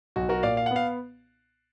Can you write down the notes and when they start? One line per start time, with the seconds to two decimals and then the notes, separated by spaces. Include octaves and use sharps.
0.16 B1 F#4
0.29 F#4 A#4
0.43 A#2 D5 F5
0.57 F5
0.66 F#5
0.71 B3
0.76 F5